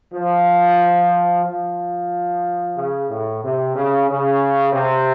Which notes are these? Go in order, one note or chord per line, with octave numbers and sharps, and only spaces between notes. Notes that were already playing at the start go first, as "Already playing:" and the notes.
F3
F3
C#3
A2
C3
C#3
C#3
C3